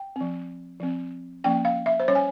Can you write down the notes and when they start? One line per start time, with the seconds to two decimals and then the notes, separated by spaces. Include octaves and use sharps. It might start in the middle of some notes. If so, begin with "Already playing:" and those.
Already playing: G5
0.16 F3 C4
0.80 F3 C4
1.44 F3 A#3 C#4 G5
1.65 F5
1.86 E5
2.00 C5
2.08 G3 C#4 C#5
2.15 G#5